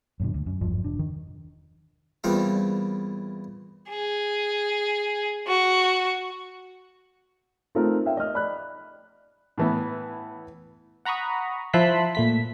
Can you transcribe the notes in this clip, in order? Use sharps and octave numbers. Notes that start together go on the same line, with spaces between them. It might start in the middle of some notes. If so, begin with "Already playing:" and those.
F#2 A#2 D3
D2
F#2
G#1 E2 G2 F3
E1 D4
D#3
E2 A#2 G3 C4 F5
G#4
F#4
A3 C4 D#4 F4 A#4
C#4 E5 F5 G5
D#5 F6
D5 B5 F#6
A2 E3 B3
F#5 A#5 B5 C#6 D#6
F3 E4 A5 C6 F#6 B6
A#2 A3 B6